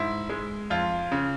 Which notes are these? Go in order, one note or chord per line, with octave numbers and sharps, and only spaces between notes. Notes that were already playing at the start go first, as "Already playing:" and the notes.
Already playing: G#2 E4
G#3
F2 F4
C#3